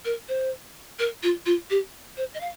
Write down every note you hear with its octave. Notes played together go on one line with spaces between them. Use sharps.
A#4
C5
A#4
F4
F4
G4
C5
D#5
F5